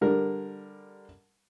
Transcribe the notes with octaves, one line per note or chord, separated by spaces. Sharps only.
D3 G3 A#4